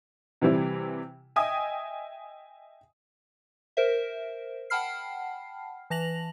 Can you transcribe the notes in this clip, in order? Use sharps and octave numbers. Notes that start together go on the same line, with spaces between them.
C3 E3 G3 C4 E4
D#5 E5 G5 G#5 D#6
A#4 C5 E5
F#5 G5 A5 B5 F6 C7
E3 A5 A#6 F7 F#7